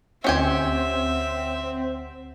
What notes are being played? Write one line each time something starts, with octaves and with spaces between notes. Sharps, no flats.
D2 C4 C#4 G4 E5 F#5 G#5